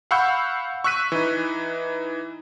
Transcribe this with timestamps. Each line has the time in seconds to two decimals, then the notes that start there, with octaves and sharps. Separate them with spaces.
0.11 F5 F#5 B5 C#6 E6 G6
0.84 C#6 E6 F#6 B6 D#7
1.12 E3 D#4